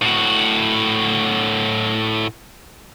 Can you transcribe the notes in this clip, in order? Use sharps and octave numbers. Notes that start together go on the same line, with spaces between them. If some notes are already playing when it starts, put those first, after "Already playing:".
A2 F#4